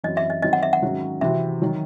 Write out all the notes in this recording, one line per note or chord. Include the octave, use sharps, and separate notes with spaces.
F#2 E3 C4 F#4 D#5
E5
D#5
D#3 F#3 C4 D#5
F#5
E5
F#5
G#2 D#3 F#3 C#4 F#4
C3 E3 C4 F#4 E5
D#3 F#3